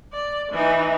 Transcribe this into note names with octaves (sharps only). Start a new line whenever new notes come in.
D5
E3 D#4